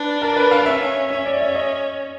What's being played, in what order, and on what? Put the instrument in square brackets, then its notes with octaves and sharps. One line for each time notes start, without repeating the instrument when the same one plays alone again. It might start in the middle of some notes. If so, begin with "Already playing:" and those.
Already playing: [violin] D4 [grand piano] B4
[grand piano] A#4
B4
F5
[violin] C#4 [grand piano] E5
[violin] C#4 [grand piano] E5
[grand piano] D5
E5
D#5